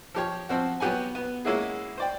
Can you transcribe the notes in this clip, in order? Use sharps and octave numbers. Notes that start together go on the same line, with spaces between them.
F3 G4 C#5
F3 C4 F#4
F#3 B3 G4 F#5 G#5
B3
G#3 A#3 C#4 E4 F#4 G#4
C5 D5 G5